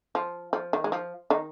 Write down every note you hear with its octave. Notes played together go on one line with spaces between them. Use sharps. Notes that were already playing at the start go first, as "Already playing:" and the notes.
F3
F3
D#3
G#3
F3
D#3 D#4